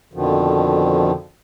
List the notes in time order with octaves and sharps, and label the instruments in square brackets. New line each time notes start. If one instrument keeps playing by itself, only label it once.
[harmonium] F2 B2 D3 D#3 F3